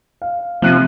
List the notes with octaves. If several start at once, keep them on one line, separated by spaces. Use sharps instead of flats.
F5
C3 F3 F#6 D#7